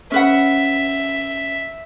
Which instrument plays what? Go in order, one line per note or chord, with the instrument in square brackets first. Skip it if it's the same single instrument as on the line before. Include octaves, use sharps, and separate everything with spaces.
[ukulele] C#4 B4 F#5 [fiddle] E5